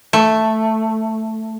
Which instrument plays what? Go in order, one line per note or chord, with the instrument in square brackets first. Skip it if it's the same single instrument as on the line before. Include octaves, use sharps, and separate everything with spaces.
[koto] A3